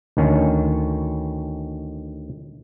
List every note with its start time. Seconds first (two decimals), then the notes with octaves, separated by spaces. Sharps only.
0.17 D2 D#3 C#4